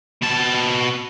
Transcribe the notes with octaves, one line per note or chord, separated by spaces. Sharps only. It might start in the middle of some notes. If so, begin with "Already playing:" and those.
B2 A5